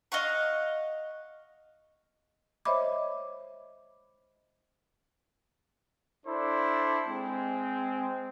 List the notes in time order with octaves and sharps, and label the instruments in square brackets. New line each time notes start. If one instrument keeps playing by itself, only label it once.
[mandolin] D#5 F5 F#5 C#6
[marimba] C5 C#5 D#5 E5 B5 D6
[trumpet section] D4 E4 A4 C5 D5
G#3 C4